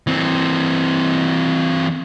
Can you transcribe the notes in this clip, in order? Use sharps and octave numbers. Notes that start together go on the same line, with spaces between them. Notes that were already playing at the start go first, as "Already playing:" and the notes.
E3 C4